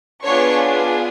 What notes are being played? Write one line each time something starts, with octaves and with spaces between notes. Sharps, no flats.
B3 D4 F4 G#4 C#5 C#6